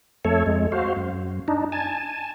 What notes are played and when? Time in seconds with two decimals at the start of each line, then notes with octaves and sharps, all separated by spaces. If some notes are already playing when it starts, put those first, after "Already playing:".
0.25 F2 A3 A4 C#5
0.46 F2 G#3
0.72 F#4 C5 F5
0.96 F#2
1.48 D4 D#4
1.72 G#5 A5